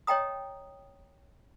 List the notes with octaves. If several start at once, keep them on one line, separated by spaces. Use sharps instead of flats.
C#5 D#5 G5 A#5 D#6